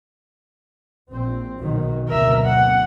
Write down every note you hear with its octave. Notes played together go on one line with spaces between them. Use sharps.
A#1 C4
B1 D#3 F#3
F#1 D2 B2 A#4 E5
F#5